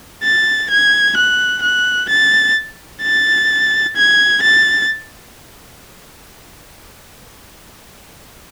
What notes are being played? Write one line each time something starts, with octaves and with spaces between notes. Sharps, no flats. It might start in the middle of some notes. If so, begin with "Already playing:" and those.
A6
G#6
F#6
F#6
A6
A6
G#6
A6